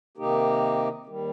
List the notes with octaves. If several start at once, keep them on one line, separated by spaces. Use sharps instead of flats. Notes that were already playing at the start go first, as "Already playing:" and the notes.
C3 D#3 A#3 D#4 G4
D#2 D#3 G3